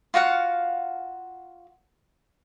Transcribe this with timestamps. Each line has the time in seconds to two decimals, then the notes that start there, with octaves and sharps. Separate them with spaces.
0.14 F4 F#4 F5 F#5